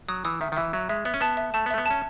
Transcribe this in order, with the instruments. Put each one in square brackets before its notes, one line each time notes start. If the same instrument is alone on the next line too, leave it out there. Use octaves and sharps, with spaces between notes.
[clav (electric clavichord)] F#3 [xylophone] D#6
[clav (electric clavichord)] E3 [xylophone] D#6
[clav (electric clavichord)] D#3 [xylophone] E5
[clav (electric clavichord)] D#3
[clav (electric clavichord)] E3 [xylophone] E5
[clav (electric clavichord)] F#3 [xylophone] E5
[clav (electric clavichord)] G#3 [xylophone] E5
[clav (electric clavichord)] B3 [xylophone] E5
[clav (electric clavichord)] C#4
[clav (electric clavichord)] B3 [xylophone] A5
[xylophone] E5
[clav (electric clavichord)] A3 [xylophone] A5
[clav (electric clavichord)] B3
[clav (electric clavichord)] A3 [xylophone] E5
[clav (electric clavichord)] B3
[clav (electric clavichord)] C#4 [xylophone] A5